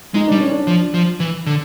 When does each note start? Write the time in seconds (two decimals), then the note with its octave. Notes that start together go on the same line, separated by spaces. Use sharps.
0.14 G#3 D#4
0.27 G3 D4
0.40 C#4
0.52 D4
0.67 F3
0.94 F3
1.20 E3
1.46 D3